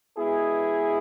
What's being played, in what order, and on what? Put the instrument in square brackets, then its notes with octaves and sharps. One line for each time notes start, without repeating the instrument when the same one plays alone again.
[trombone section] B2 G#3 B3 E4 G#4